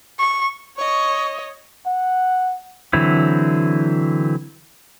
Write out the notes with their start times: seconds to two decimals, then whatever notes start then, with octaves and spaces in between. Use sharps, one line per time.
0.19 C#6
0.77 C#5 D#5 C#6
1.86 F#5
2.93 D3 E3 F#3 C4 E4